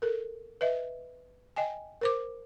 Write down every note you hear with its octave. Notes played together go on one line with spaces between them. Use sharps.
A4 A#4
B4 D#5 E5
D#5 G5 G#5
A#4 C5 D6